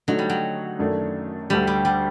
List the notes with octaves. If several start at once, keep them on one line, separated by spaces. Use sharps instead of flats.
D3 F#3 A3 D#4 F#4
G3
F#3
F#2 D#3 A3 D4 A4
D2 D3 G3 A3 D4 G4
G3
G3